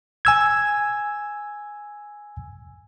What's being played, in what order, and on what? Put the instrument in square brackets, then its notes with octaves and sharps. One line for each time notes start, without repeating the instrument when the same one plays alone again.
[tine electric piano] G#5 E6 G#6